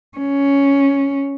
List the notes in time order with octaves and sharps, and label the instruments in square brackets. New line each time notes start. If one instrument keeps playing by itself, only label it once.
[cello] C#4